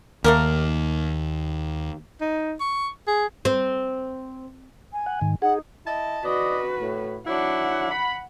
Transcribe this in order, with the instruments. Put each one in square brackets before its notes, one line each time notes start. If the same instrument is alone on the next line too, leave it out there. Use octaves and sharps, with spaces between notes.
[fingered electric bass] D#2 [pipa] A3 A#3 A#4
[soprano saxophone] D#4
C#6
G#4
[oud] C4
[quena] G#5
[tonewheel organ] F#5
G#2 D#3
[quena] D#4 [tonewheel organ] G#4 [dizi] F#5
[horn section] E4 D#5 A5
[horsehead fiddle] F#4 B4 [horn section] D5 D#5
[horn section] A2
[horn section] F#3 D4 E4 [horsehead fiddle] F#5
[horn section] B5